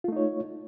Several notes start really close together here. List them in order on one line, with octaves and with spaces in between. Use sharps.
F4 A3 D#4 C#5